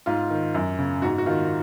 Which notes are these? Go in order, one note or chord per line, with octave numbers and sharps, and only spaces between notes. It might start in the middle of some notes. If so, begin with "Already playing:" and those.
G#2 F4
D#3
F#2
C#3
G#2 F#4
F#4
D#3 F4